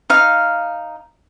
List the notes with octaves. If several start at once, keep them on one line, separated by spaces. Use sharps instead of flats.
D#4 F5